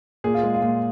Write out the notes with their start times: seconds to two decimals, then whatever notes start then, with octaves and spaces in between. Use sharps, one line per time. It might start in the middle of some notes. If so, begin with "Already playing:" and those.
0.24 A#2 G#4
0.35 F4
0.43 G#3
0.54 F4
0.62 A#2